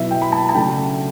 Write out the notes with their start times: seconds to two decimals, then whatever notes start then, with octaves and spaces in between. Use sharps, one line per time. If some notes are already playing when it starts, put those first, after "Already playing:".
Already playing: B2 F#3 B3 E4 E5
0.11 G5
0.22 B5
0.32 A5
0.49 A5
0.54 C#3 F#3 A3 D4 G5